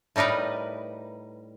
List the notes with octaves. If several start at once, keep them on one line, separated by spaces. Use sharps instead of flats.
A2 G3 D#4 A#4 B4